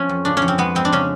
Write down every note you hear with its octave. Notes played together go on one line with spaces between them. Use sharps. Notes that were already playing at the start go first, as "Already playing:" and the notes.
Already playing: F3 C#4
F2
C#3 D4
C#4
F2
C4
G#3 B3
G#3 C4
D4
C#3 C#4